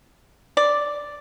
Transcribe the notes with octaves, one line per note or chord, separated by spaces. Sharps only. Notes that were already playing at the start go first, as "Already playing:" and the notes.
D5